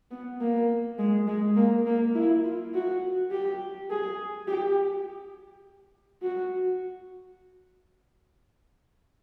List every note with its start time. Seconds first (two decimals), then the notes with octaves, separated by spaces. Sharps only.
0.11 B3
0.41 A#3
0.98 G#3
1.27 G#3
1.56 A#3
1.86 A#3
2.15 E4
2.44 F4
2.74 F#4
3.31 G4
3.90 G#4
4.48 G4
6.22 F#4